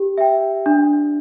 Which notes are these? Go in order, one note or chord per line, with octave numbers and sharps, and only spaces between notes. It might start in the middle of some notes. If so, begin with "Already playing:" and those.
Already playing: G4
E5 G5
D4